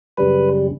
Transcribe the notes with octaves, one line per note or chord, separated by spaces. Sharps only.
F#2 C#3 G3 B4